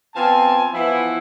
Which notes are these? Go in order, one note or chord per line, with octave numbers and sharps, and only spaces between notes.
F3 B3 C4 G#5 A5
E3 F3 B3 E4